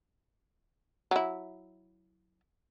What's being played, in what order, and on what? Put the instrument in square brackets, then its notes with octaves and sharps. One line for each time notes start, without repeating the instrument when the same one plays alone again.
[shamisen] F#3 E4